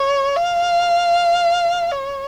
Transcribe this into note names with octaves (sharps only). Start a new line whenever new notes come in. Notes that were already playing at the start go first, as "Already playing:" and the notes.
Already playing: C#5
F5
C#5